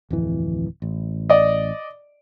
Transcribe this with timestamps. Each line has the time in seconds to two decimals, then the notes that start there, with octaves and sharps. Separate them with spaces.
0.10 D1 F2 E3
0.82 A1
1.30 D5 D#5